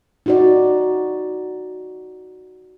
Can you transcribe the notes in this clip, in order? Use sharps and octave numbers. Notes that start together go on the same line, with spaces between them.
D#4 F#4 D5